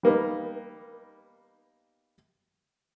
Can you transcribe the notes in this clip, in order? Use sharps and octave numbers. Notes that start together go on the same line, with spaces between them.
G3 A#3 B3 D#4